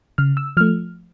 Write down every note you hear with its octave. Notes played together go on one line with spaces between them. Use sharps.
C#3 F6
E6
F3 A3 F6